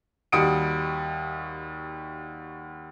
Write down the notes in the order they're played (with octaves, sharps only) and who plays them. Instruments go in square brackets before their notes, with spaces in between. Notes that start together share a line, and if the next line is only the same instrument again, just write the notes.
[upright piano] D#2 G3 F#4 D#6 C#7 D7